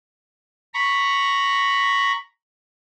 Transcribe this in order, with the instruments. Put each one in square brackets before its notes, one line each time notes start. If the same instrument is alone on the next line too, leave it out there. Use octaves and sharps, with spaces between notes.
[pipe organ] A#5 B5 C#6